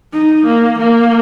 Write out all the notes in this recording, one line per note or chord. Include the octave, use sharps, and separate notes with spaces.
D#4
A#3
A#3